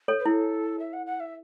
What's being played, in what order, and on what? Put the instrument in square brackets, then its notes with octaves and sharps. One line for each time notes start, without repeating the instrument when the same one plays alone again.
[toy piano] A4 C#5
[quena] B4
[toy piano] E4 [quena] A4
[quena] E5
F#5
F#5
E5